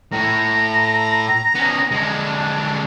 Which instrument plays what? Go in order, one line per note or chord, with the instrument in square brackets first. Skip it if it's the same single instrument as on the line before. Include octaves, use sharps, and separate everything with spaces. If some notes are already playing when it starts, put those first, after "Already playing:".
[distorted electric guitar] A2 [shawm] A#5
[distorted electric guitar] B3 C#4
D3 G#3
[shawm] D4